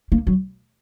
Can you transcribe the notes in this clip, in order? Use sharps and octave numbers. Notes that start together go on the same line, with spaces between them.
A#3
F#3